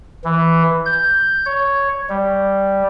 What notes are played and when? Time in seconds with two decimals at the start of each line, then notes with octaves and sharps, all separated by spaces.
0.24 E3
0.86 G6
1.46 C#5
2.09 G3